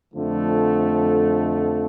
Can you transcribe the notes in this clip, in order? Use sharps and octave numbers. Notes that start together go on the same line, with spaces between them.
F2 D3 F3 A3